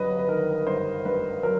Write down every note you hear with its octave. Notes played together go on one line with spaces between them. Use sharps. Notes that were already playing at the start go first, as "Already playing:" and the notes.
Already playing: G1 G2 F#3 B4 D#5
B4
D#3 A#4
G1 C5
G2 B4
F#3 A#4